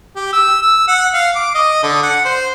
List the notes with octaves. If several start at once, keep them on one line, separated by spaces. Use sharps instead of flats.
G4
E6
E6
F#5
F5
D6
D#5
D3
F#5
C5